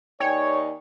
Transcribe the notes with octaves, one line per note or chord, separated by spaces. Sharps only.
D#2 D#4 C#5 D5 G5 G#5